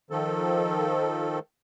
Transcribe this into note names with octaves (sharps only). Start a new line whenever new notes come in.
D#3 F3 A4